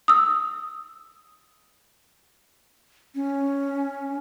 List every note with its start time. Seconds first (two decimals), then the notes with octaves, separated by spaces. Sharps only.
0.08 D#6 E6
3.15 C#4